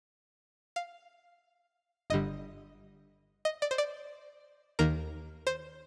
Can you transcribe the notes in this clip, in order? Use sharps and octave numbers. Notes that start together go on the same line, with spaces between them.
F5
G1 G2 D3 G3 D#5
D#5
D5
C5
D5
D#2 D#3 A#3 A#4
C5